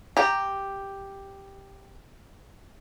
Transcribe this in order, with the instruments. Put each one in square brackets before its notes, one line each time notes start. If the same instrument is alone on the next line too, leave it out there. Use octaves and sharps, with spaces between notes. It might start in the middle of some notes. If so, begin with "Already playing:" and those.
[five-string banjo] G4 A#5